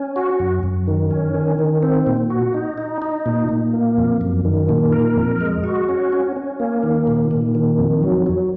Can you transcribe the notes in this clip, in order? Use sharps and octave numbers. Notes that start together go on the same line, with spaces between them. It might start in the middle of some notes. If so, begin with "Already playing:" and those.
Already playing: C#4
F#4
F#2
F#2
D#3
C#4
D#3
D#3
C4
A#2
F#4
D#4
D#4
D#4
A#2
A#2
A#3
F2
F#2
D#3
A#2
A#4
F2
G#3
F#4
C#4
C#4
C#4
A#3
D#3
A#2
A#2
D#3
F2
F#3
F#3